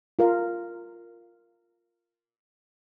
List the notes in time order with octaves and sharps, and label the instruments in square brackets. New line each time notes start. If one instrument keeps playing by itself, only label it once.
[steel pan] F4 A#4 F5